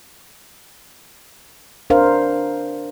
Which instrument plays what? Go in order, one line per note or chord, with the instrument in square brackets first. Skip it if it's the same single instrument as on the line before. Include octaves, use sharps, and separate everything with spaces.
[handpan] D4 A#4 C5 F5